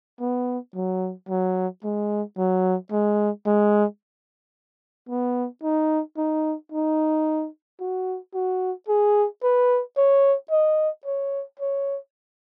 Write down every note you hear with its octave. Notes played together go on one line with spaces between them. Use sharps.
B3
F#3
F#3
G#3
F#3
G#3
G#3
B3
D#4
D#4
D#4
F#4
F#4
G#4
B4
C#5
D#5
C#5
C#5